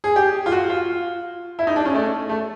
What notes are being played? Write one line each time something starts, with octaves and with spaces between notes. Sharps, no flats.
G#4
G4
F4
F#4
F4
E4
D#4
D4
C#4
A3
A3